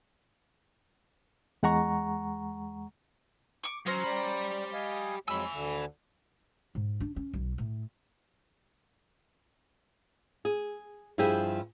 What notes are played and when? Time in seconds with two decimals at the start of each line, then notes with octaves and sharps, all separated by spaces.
1.63 E2 G#3 F#5 A#5 C#6
3.63 C#6 D6
3.87 F#3 C#4 C5 A#5
4.04 G3 G4 B5
4.73 D#5 F5 G#5
5.28 F2 F#3 G#3 G#5 B5 E6
5.53 D2 D3
6.75 G#2
7.00 D4
7.16 C#4
7.34 B1
7.58 A2
10.45 G#4
11.18 G2 F3 E4 G4 G#4 G5